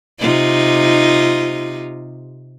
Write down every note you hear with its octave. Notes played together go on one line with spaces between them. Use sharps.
C3 D#4 F4